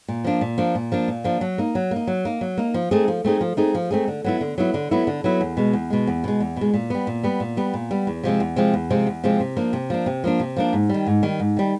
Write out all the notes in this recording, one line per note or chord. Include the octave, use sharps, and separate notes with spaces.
A#2
F3 A#3 D4
A#2
F3 A#3 D4
A#2
F3 A#3 D4
A#2
F3 A#3 D4
F#3
A#3 D#4
F#3
A#3 D#4
F#3
A#3 D#4
F#3
A#3 D#4
F3
A3 C4 D#4 G#4
F3
A3 C4 D#4 G#4
F3
A3 C4 D#4 G#4
F3
A3 C4 D#4 G#4
D3
F#3 B3 E4
D3
F#3 B3 E4
D3
F#3 B3 E4
D3
F#3 B3 E4
E2
B2 G#3
E2
B2 G#3
E2
B2 G#3
E2
B2 G#3
A#2
G3 B3
A#2
G3 B3
A#2
G3 B3
A#2
G3 B3
E2
C3 F3 G#3 C4
E2
C3 F3 G#3 C4
E2
C3 F3 G#3 C4
E2
C3 F3 G#3 C4
C3
F3 A#3 D4
C3
F3 A#3 D4
C3
F3 A#3 D4
C3
F3 A#3 D4
G#2
D#3 G3
G#2
D#3 G3
G#2
D#3 G3